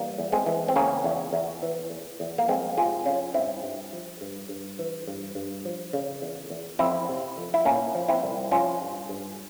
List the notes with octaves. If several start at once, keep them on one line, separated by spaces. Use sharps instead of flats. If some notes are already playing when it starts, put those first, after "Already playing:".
Already playing: E3 G3 A#3
E2
G#3 C4
E3
C4
C#3 A#3 C#4
E2
E2
E3
E2
E2
A#3
F2 G#3 C4
C3 F4 G#4
F2 C#4 F4
G2 C4 E4
G2
F3
G2
G2
E3
G2
G2
F3
C#3
E2
E2
F2 C4 E4
C3
F2
E4
A#2 A#3 C#4
F3
C4 E4
C2
F3 C#4 F4
G2
G2